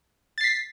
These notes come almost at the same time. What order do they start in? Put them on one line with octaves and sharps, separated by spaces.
A6 C7 B6